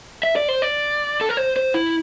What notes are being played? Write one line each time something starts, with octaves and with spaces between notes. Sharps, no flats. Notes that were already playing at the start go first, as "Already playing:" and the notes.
E5
D5
C5
D5
A4
A#4
C5
C5
E4